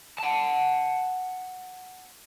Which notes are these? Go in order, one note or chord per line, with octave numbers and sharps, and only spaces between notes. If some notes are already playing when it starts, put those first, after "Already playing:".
F#5 A5